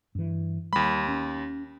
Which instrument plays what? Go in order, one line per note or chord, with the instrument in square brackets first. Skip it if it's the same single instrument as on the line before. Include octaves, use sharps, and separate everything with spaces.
[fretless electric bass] G2 E3
[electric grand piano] D#2 B5 [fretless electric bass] G3
[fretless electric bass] C#4